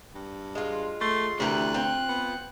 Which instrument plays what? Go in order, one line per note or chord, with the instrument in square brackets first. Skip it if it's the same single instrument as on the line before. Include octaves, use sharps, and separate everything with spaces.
[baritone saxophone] G2
[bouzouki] G#3 F4
[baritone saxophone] A3 [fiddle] C6
[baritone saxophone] D2 [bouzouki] C3 E3 A#4 [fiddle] F#6
[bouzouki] C4 F4
[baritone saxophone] B3